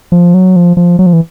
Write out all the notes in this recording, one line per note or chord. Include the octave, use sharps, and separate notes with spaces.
F3
F#3
F3
F3
F#3
F3
E3